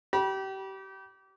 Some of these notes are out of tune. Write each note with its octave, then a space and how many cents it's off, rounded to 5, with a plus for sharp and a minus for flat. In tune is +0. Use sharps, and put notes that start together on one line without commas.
G4 -30 B5 -35